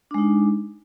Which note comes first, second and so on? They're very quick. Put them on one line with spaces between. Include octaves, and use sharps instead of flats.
D4 G#3 D#4